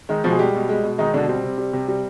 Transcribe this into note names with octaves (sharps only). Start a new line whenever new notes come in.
D#3 G#3 D#4
B2 F3 F4
G#4
G3 G#3 G4
B2
G#3
B2
D#3 G#3 D#4
B2 D3 D4
G3 C4
C3
G3
C3
G3